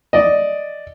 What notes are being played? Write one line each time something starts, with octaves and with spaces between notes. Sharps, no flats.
D5 D#5